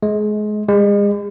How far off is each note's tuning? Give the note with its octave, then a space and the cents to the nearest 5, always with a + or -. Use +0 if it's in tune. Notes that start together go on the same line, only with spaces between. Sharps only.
G#3 +25
G#3 -40